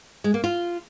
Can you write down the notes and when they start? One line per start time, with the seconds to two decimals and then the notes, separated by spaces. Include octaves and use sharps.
0.24 G#3
0.34 A#3
0.44 F4